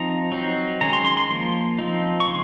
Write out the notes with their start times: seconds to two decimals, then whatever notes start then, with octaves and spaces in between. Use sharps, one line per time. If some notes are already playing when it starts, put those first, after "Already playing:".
Already playing: F3 C4 D#4 A#5
0.32 F#3 C4 D#4
0.81 D#3 G#3 C#4 A#5
0.93 C6
1.05 C6
1.17 C6
1.30 F3 A#3
1.79 F3 C4 D#4
2.20 C#6
2.27 C#3 G#3 C6